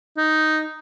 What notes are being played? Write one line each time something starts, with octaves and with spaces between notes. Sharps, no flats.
D#4